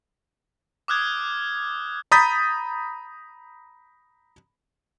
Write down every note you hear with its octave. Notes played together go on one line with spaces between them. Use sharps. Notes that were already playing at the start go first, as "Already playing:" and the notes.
D6 D#6 F6 F#6 G#6
A#5 B5 D#6 G6 A6 B6